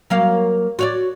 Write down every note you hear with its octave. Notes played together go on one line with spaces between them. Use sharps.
F#3 A#3 F5
F#4 C#5 D5